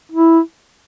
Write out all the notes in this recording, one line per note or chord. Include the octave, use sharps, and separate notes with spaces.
E4